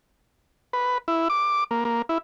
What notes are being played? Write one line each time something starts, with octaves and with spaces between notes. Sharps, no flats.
B4
E4
D6
A#3
A#3
E4